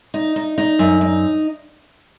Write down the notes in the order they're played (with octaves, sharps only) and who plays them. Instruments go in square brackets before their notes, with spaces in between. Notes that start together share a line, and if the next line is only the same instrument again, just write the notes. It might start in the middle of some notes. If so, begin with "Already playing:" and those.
[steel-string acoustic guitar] D#4
D#4
D#4
F#2
D#4